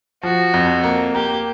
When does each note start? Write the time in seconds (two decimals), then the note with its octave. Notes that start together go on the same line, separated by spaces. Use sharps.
0.23 F3 F#4
0.54 F2
0.84 A#3
1.14 A#3 G4